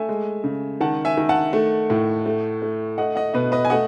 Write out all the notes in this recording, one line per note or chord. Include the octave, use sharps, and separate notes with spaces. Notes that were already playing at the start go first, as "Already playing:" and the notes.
Already playing: A3 E5 G#5
G#3
C#3
D#3 F#5 A5
E5 G#5
D#3
F#5 A5
A3
A2
A3
A3
A3 D#5 F#5
D#5 F#5
B2 B4 D#5
B4 D#5
G#5
A3 D#5 F#5